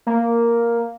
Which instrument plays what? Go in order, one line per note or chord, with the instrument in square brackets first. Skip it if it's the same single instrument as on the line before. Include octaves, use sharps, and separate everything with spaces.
[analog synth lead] A#3